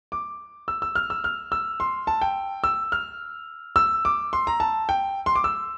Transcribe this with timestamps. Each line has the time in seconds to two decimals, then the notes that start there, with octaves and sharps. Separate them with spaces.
0.12 D6
0.68 E6
0.82 E6
0.95 F6
1.10 E6
1.24 F6
1.52 E6
1.80 C6
2.07 A5
2.22 G5
2.64 E6
2.92 F6
3.76 E6
4.05 D6
4.33 C6
4.47 A#5
4.60 A5
4.89 G5
5.26 C6
5.35 D6
5.44 E6